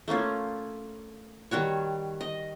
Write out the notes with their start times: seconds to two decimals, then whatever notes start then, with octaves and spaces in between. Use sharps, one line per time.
0.08 A3 A#3 C#4 F4
1.51 D#3 G3 F#4 C#5
2.21 D#5